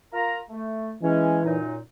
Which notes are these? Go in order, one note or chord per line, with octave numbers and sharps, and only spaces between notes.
F4 A#4 A#5
A3
E3 G#3 C#4
F#2 A#2 D#4